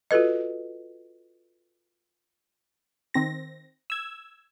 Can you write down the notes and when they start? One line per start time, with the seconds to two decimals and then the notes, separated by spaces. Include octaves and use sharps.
0.11 F4 F#4 A4 B4 D#5
3.14 D#3 C4 A#6
3.90 E6 G#6